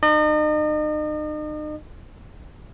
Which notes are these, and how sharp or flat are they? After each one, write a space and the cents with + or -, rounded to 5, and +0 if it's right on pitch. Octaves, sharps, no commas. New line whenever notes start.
D#4 -40 D#5 -40